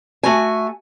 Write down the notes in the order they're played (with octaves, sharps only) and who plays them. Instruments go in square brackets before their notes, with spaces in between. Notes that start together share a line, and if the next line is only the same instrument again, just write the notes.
[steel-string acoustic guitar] A3 F#4 G#5